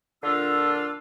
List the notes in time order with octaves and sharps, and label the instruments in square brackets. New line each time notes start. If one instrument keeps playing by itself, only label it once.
[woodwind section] A#2 D3 D4 F4 E6